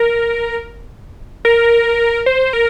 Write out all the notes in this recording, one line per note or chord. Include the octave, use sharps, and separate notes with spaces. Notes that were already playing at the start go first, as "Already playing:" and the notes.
Already playing: A#4
A#4
C5
A#4